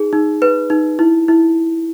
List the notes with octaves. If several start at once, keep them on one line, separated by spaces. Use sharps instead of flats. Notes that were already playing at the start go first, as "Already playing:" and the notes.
Already playing: D#4 G#4
D#4
B4
D#4
E4
E4